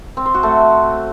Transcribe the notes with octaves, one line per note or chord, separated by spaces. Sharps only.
C4
C5
F#4
A3